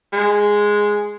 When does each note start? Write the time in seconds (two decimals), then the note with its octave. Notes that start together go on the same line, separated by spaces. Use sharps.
0.13 G#3